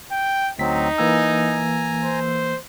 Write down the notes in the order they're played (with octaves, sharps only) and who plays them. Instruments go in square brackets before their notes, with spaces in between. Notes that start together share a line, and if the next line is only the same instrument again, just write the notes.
[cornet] G5
[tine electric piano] D2 B6 [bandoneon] F#3 C4 [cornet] D#4
[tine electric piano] E3 A#3 E6 [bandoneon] G#5 A#5
[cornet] C5